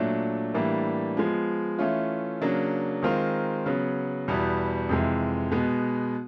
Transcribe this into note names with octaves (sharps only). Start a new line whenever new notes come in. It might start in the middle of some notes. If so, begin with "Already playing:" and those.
Already playing: A#2 F#3 A3 D4
A2 E3 G3 A#3 D4
F3 G#3 B3
E3 A3 C#4 F4
C#3 F#3 A#3 D4
D#3 G#3 C4 F4 A#4
C#3 F#3 B3
E2 B2 G3 B3 E4
F2 C3 E3 G#3
B2 G#3 B3